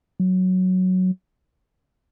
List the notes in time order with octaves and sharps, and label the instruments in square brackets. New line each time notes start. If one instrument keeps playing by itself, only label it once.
[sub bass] F#3